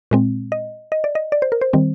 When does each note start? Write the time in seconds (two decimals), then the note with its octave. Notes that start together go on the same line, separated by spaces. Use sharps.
0.11 A#2 G#3 C4
0.52 D#5
0.92 D#5
1.04 D5
1.15 D#5
1.32 D5
1.42 C5
1.52 A#4
1.61 C5
1.73 D#3 G3 C4